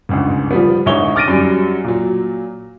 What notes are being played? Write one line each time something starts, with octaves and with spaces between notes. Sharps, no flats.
G1 C#2 G#2
F3 G3 B3
D2 G#2 D#4 E4 C#5 G7
D6 F6 A6 A#6 D7 D#7
F#2 F#3 G3
A#2 F#3